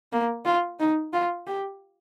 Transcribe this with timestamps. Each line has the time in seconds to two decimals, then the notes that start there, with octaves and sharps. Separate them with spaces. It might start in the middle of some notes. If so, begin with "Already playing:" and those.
0.13 A#3
0.45 F4
0.80 D#4
1.13 F4
1.47 G4